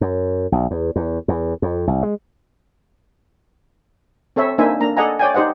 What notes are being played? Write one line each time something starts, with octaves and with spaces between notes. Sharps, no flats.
F#2
B1
E2
E2
E2
F2
C2
G#3
C4 A4 C#5 E5
A#3 D4 D#4 C5 E5 G#5
A#3 D4 A#5
A4 D5 D#5 F#5 G#5 A#5
C#5 D5 G5 G#5
D#4 G4 C5 D#5 F#5